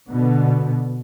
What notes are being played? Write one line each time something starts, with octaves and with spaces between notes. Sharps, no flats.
B2 D3 B3